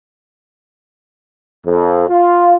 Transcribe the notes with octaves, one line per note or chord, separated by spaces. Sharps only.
F2
F4